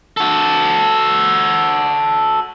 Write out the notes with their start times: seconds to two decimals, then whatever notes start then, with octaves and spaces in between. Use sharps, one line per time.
0.17 F#4 A4